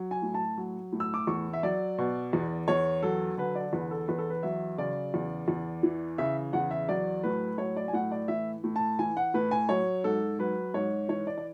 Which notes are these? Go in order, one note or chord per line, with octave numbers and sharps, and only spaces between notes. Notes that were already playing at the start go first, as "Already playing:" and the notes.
Already playing: F#3
G#5
A2
A5
F#3
A2
E6
D6
E2 C#6
E5
F#3 D5
B2
E2
E2 C#5
F#3 A4
D3 B4
D5
E2 B4
A4
E2 B4
A4
B4
F#3 E5
C#3 D5
E2
E2
E3
C#3 E5
E2 F#5
E5
F#3 D5
A2 B4
F#3 C#5
D5
G#5
A2 F#5
D5
E3 E5
A2
A5
E3 G#5
F#5
A2 B4
G#5
F#3 C#5
G#2 A4
F#3 B4
G#2 C#5
E3 C#5
D5
D5